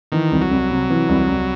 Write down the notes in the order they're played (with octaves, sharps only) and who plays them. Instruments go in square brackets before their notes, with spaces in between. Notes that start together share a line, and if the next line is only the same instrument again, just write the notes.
[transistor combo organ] D#3 [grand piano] E3
[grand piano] C2
[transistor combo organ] F#3
[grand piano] C2
C3
E3
C2
C2